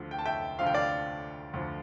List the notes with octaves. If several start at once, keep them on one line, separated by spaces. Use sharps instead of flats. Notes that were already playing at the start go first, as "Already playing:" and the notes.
Already playing: D2 D3 F3
G5
A5
E5 G5
D2 D3 F3 F5
G5
D5 F5
D2 D3 F3